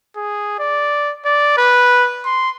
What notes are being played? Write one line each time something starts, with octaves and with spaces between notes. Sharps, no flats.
G#4
D5
D5
B4
C6